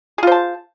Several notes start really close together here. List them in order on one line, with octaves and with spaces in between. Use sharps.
G#4 F4 C5 A5